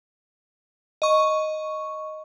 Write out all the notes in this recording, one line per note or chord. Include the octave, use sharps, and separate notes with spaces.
D#5 C#6